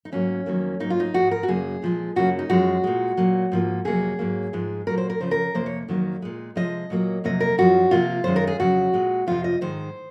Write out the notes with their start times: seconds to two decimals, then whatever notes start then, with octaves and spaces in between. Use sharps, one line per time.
0.05 D#4
0.12 G#2 F#3 A#3 C#4
0.46 F2 D#3 F#3 A#3
0.80 G#2 F#3 A#3 D#4
0.90 F4
1.00 D#4
1.14 G#2 F3 G#3 F#4
1.31 A#4
1.43 F#4
1.48 F#2 C#3 F#3 A#3 G#4
1.82 A#2 F3 G#3
2.16 F#2 C#3 F#3 A#3 F#4
2.39 D#4
2.50 F#2 F3 G#3 F#4
2.84 A#2 G#3
3.17 A#2 F#3 A#3
3.52 G#2 F3 A#3
3.85 F2 C3 F#3 A#3 G#4
4.19 G#2 F#3 A#3
4.53 G#2 F3 G#3
4.87 A#2 F#3 A#3 A#4
4.98 C5
5.10 A#4
5.20 F2 C#3 F3 C5
5.31 A#4
5.54 F2 C3 F3 A#3 C5
5.66 C#5
5.88 F2 D#3 F#3 A#3
6.22 A#2 G#3
6.56 C3 F3 G#3 D#5
6.90 A#2 F#3 A#3
7.24 F2 C3 F#3 A#3 D#5
7.40 A#4
7.58 F#2 F3 G#3 F#4
7.91 C3 F3 A#3 F4
8.24 F#2 D#3 G#3 C5
8.36 A#4
8.47 G#4
8.59 F2 C#3 F#3 F#4
8.93 A#2 G#3
9.27 F2 C3 F3 F4
9.44 D#5
9.61 G#2 D#3 G#3 C5